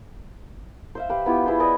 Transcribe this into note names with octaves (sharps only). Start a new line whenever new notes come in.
C5 E5 F5
G4 B4 F5
B3 E4 F4 G4
B3 E4 G#4 C5
B4 D5 D#5 G#5